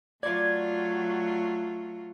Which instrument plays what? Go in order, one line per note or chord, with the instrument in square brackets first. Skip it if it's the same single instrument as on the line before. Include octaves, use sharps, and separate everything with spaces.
[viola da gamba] F#3 A3 F4 [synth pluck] D5 G#6